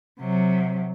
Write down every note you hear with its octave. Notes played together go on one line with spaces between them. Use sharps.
C3 F#3